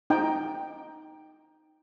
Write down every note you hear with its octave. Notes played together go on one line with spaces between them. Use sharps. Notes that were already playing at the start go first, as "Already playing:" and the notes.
D#4 G5